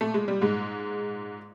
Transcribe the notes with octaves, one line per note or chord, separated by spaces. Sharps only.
A#2 A3
G#3
G3
G#2 G#3